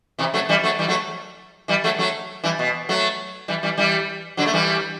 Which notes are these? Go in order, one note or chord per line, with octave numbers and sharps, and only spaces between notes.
C3 E3
F#3 A3
E3 G3
F#3 A3
E3 G3
F#3 A3
E3 G3
F#3 A3
F#3 A3
E3 G3
B2
F#3 A3
E3 G3
E3 G3
E3 G3
D3 F#3
A3
E3 G3